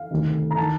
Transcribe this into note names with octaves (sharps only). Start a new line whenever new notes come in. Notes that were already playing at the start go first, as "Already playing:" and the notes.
Already playing: F5
D2 C3 D#3
A#5
D#3 A5